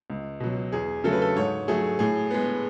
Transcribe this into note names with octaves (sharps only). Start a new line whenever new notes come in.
C#2
B2 F#3
E2 G#4
C#3 F#3 A3 A4
B4
A4
G#2 C#5
F#3 A3 G#4
A2 G#4
G#3 B3